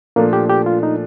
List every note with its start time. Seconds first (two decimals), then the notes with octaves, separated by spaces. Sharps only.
0.16 A#2 F3 A3 A#3 D4
0.33 G4
0.50 G4
0.66 F4
0.83 D#4